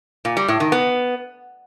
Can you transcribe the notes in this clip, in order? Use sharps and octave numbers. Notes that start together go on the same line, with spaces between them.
A#2
G3
A2
D#3
B3